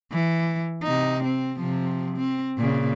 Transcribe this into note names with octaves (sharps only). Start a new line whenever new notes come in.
E3
C3 D#4
C4
C3 F3
C4
A#2 C#3